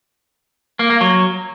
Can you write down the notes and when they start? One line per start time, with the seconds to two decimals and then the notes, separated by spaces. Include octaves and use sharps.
0.79 A#3
0.90 A#3
1.01 F#3